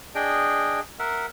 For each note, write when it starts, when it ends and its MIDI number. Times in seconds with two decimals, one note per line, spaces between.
0.15 0.80 62
0.15 0.80 68
0.15 0.80 75
0.15 0.80 79
0.99 1.26 70
0.99 1.26 76
0.99 1.26 78